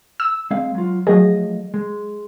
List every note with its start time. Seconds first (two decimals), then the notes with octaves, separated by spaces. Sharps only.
0.20 E6
0.51 G#3 C4 F5
0.75 F#3 F4
1.07 F3 F#3 A3 G#4 D#5
1.74 G#3